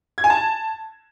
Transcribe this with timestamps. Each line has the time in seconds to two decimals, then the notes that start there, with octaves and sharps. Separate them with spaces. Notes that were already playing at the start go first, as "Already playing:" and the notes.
0.18 G#6
0.24 G#5
0.30 A5